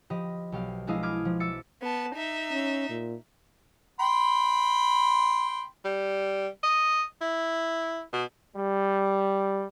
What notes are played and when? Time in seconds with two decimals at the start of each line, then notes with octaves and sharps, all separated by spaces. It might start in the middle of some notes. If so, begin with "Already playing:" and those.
0.10 F3 G4 D#5 B5
0.52 B1 G4 F5
0.87 F3 G#3 D4 E4 D#5 F5
1.03 B5 D6 D#6 F6 G#6
1.25 F3
1.40 E5 D6 E6 A6 C#7
1.82 B3 A5
2.15 D#4 E5
2.51 C#4
2.90 A#2
4.00 G5 B5 C6
5.85 G3
6.63 D#5
7.21 E4
8.13 B2
8.57 G3